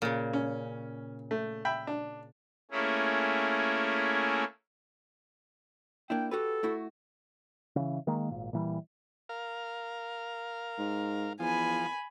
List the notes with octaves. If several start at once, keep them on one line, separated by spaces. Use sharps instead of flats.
A#2 C#3
C#4
A3
E5 G5 B5
D4
A3 A#3 C#4 E4 G#4
A#3 D4 E4 G5
F#4 G4 A4 B4
A3 E4 F#4
C#3 E3
D#3 G#3 A#3
G#1 A#2
A#2 E3 G3
A#4 F5
G#2
E2 F3 G#5 B5